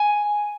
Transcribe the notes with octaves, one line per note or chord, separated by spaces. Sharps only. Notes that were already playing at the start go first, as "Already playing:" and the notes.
Already playing: G#5